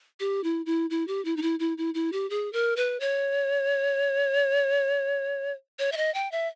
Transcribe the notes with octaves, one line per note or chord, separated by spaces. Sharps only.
G4
E4
E4
E4
G4
E4
D#4
E4
E4
E4
E4
G4
G#4
A#4
B4
C#5
C#5
E5
D#5
G5
E5